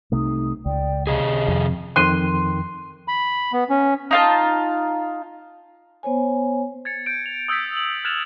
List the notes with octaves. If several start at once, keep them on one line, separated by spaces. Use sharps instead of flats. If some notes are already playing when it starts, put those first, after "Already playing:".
C2 C3 A3 D#4 D#6
C#2 D5 G5
C3 G#4 D#5 A5
F2
F2 D#3 G5 C6 F#6 D#7
B5
B3
C#4
D#4 F4 A5
B3 C5 C#5 G#5
G#6 A6 C#7
G6 D7
F7
D#6 E6 G6 A6 B6
F#7
F6 F#6 G#6 A6 E7 F7